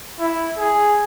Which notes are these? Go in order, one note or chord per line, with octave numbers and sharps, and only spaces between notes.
E4
G#4